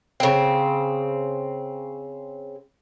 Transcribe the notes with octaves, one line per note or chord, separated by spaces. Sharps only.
C#3 C4